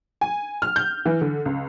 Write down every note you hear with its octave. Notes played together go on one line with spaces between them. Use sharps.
G#5
F6
G6
E3
D3
C#2